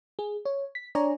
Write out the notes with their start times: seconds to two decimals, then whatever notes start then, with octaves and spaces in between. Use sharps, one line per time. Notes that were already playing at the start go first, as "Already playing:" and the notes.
0.19 G#4
0.45 C#5
0.75 B6
0.95 D4 C#5 D5 G#5 A#5